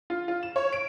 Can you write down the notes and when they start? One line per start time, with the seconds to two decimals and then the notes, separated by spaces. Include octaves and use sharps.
0.10 F4
0.28 F4
0.43 E7
0.56 C#5
0.73 D7